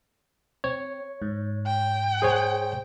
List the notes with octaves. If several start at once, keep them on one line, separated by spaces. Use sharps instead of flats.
C4 C#5
G#2
G5
G#4 C5 C#5